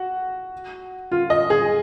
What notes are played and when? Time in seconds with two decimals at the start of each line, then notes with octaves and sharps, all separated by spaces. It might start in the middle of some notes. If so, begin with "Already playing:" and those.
Already playing: F#4
1.12 F4
1.30 D#5
1.50 G#4